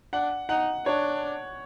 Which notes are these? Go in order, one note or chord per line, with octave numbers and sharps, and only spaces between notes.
D4 F#5
D#4 F#5
D4 C#5